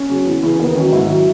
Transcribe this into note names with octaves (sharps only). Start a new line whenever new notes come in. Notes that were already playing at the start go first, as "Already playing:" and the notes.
Already playing: C#4
C#3 F#3
E2
C#3 E3
D#2 B3
D#3 F#3 C#4
G#2 E4
D#3 F#3